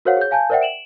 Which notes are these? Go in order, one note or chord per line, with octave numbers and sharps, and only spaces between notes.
F#4 A#4 C5 C#5 F5 F#5
G#4 C#5 G6
F5 G#5 A5 G6
A#4 C5 D5 E5 F#5 G5
D7 E7 F#7